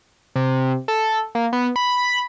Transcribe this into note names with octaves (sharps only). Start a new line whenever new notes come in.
C3
A4
A#3
B3
B5